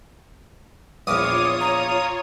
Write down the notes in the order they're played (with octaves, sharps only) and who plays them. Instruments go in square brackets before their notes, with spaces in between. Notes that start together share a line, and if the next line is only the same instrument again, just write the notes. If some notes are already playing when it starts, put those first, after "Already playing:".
[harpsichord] A#1 E2 [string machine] F4 C#5 [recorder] D6 [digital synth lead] D#6
[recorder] A#5